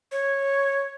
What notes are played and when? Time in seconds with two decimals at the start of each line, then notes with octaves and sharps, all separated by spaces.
0.12 C#5